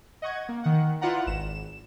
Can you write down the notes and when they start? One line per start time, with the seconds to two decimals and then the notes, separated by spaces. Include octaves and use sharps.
0.22 D#5 F#5 C#6 G#6
0.49 A#3
0.64 D#3 F#5
1.01 E4 F4 B4 D5 F#5 A#5
1.26 G#1 E7